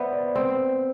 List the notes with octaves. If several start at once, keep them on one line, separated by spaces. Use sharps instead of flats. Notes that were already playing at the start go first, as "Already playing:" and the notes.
Already playing: B3 C5 D5 E5
D5
C4 C5